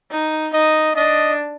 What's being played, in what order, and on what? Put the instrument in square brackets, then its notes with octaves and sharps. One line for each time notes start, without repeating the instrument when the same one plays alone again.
[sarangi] D#4
[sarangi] D#4 [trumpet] D#5
[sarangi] D4 [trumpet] D#5